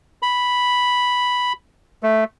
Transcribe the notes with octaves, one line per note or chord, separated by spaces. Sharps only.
B5
A3